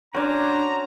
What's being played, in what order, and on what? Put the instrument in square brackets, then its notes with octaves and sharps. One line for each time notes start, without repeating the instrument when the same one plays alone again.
[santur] C#4 D5 [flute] D4 [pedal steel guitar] F#4 C5 G#5 [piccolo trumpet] A#5